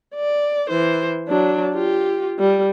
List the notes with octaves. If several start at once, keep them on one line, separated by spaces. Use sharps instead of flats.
D5
E3 C5
F#3 D4
F4 G4
G3